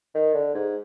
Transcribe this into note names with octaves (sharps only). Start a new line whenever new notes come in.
D#3
D3
G#2